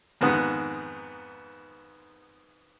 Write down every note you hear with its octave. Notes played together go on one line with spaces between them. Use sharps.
F2 G#2 D#3 B3 F#5 D#6